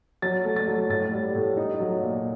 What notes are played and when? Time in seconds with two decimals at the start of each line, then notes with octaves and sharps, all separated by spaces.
0.22 F#3 A6
0.45 A3
0.56 A6
0.68 F#3
0.89 A2 A6
1.13 G3
1.35 A2
1.57 D#4
1.80 F#3
2.02 A#2